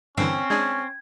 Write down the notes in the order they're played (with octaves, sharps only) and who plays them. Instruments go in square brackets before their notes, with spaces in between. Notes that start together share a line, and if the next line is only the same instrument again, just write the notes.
[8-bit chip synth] G2 D3 E3 [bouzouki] C4 [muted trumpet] C#4
[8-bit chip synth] G#3 D4 G#4 [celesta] G#6